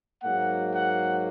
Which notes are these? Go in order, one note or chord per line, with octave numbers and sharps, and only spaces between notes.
G#2 F#3 A#3 F#5
F#5